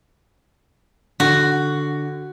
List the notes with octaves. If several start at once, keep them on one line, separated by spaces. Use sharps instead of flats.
D3 F#4